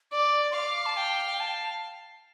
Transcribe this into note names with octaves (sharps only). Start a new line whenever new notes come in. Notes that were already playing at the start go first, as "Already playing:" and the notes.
D5 D6
C6
F5 D6
A5
G5
G5
A5